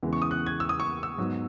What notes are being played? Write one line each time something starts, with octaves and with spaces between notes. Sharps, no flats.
E2 C#3 E3 G#3
C#6
D#6
F#6
G#6
E6
D#6
C#6
E6
G#2 F#3 B3